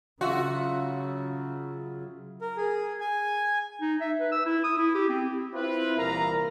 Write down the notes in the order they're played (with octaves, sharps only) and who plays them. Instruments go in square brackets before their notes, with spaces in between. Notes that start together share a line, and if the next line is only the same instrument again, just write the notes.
[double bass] C#3 F#3 [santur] F4 E5 [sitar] F#4
[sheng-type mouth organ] A#4
G#4
G#5
[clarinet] D#4
E5
B4
E6
E4
D#6
E4
G4
C4
[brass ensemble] C4 E4 F4 B4
C2 A#2 E3 A#4 F5 A#5